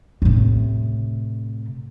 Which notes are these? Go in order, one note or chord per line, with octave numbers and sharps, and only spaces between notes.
A2 C3